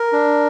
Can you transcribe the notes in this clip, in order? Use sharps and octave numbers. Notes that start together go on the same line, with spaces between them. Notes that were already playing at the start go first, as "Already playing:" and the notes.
Already playing: A#4
D4